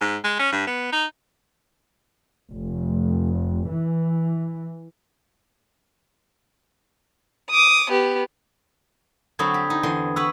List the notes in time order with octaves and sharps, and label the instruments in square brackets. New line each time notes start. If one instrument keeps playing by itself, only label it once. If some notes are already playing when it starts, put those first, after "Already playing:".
[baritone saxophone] G#2
G#3
C#4
G2
B3
D#4
[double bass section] F1
E3
[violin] D6 D#6
B3 G4
[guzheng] D3 F#3 C4 [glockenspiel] B5 D#6 G#6
[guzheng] G4
D#4
E2 D3 C6
[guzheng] B4 C#5 F#5 [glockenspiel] E6